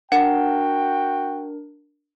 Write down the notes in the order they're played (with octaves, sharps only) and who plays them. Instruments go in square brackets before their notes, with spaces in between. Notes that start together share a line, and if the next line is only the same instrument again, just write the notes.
[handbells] D4 A#4 [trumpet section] F#4 G5 [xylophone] F#5